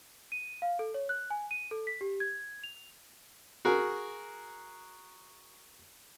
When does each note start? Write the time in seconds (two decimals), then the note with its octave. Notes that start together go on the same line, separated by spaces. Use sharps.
0.32 D#7
0.62 F5
0.79 A4
0.94 C#5
1.09 F#6
1.30 G#5
1.51 D#7
1.71 A4
1.87 B6
2.01 G4
2.20 G#6
2.64 F7
3.65 F#4 G#4 A#4